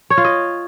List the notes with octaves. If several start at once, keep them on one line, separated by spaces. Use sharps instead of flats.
C#5
F4
D#5